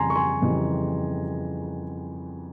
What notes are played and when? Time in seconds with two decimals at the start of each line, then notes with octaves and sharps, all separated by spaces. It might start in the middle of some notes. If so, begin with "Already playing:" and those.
Already playing: F2 C#3 E3 G3 G#5 A#5 C6
0.10 C#6
0.16 G#5 C6
0.42 F2 C#3 E3 G3